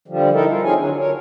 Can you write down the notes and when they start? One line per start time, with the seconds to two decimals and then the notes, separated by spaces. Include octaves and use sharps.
0.08 D3 F3 G3
0.33 D#4 E4 A4 A#4
0.47 F4
0.64 C4 D#4 F4 G#4 C#5 G#5
0.77 D3 F#3 D4
0.98 A#4 C#5